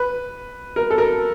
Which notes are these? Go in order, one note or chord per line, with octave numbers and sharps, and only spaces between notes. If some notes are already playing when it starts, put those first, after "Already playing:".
Already playing: B4
A#4
A4
A#4